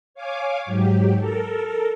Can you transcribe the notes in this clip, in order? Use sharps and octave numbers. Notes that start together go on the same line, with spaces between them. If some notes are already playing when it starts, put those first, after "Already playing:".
C#5 F5 G#5 D6
G#2 F#3 G4
A4 A#4